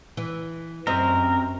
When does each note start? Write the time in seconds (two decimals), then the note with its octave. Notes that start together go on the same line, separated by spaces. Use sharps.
0.17 E3
0.87 F#2 C4 G4 A#4 D#5